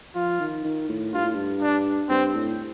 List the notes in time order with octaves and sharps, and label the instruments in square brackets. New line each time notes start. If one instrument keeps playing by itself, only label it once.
[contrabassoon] F3 [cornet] F4
[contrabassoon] D#3
D#3
A2
[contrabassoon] G2 [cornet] F4
[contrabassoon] A2
G2
[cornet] D4
[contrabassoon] G2 [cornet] C4
[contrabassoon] A2